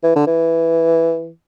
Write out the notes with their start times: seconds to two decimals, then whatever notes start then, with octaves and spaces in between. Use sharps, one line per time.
0.03 E3
0.16 D3
0.27 E3